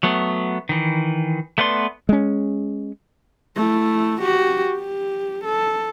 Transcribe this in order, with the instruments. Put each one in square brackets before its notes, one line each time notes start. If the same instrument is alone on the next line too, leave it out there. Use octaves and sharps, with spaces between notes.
[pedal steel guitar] F#3 A3 B3
D#3 E3
A3 B3 B4 D5 C6
[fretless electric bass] G#3 C#4
[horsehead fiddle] A3 E4
F#4 G4
G4
A4